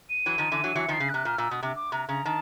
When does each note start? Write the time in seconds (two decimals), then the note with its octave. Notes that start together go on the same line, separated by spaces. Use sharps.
0.10 D#7
0.26 E3 F#3
0.38 D#3 F3
0.52 D3 E3
0.63 E3 F#3
0.75 E3 F#3 C#7
0.88 D#3 F3
0.93 C7
1.00 C#3
1.09 C3 F#6
1.25 A#2 F6
1.38 A#2 E6
1.51 B2 D#6
1.63 C3 D6
1.76 D6
1.92 C3 A#5
2.08 C#3 A#5
2.25 D#3 A5